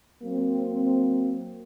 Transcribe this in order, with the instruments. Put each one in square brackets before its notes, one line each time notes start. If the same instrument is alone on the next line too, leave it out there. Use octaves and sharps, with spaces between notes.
[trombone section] F#3 A#3 C4